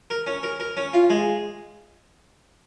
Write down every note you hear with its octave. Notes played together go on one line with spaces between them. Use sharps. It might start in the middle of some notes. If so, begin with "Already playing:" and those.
A#4
C#4
A#4
A#4
C#4
F4
G#3